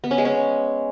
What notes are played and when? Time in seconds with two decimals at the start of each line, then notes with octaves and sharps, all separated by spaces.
0.04 B3
0.11 C#4
0.18 G#3
0.25 C#4